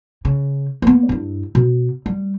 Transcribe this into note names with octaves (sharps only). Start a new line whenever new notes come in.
C#3
A#3 B3
G2 E4
B2
G3